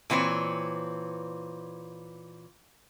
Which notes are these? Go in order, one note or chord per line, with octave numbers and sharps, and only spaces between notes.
A#2 E3 C4 C#5